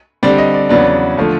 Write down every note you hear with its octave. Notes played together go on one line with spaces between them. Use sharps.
D3 G3 C4 D5
D#5
D5
E2 C#3 F#3 B3 D4 D5
D3 F3 A3